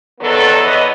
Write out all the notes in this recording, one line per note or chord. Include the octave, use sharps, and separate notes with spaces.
E2 D3 D#3 F#3 B3 A4
E2 E3 B3 C#5 D#5